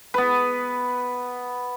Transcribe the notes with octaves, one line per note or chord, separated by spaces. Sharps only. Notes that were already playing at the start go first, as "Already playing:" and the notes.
B3 B4